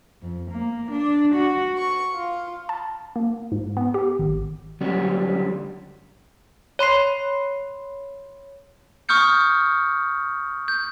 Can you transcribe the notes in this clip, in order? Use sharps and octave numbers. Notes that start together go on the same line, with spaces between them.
F2
A#3
D4
F#4
C#6
F4
A5
A#3
G#2
B3
G4
G#1
D3 F#3 G3 B3 C#4 D4
C#5 B5 C6 C7
C#6 D#6 F6 G6 C#7
G6